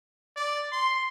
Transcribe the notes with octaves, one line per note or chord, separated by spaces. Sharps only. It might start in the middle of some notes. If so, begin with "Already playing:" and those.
D5
C6